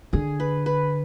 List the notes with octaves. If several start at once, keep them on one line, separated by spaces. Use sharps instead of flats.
D3 G#4
B4
B4